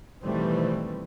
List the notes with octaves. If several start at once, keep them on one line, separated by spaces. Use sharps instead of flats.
B2 D#3 E3 G3 A3 C4